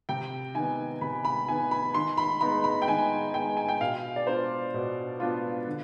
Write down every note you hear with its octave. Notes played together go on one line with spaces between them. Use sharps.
C3 G5
D#3 B3 G#5
C3 B5
B5
D#3 B3 G#5
B5
D#3 C6
B5
G#3 B3 D#4 B5
B5
G5
D#3 G#5
G#3 B3 D#4 G5
G#5
G5
B2 F5
D5
B3 D4 F4 C5
B2
B3 D4 F4
D3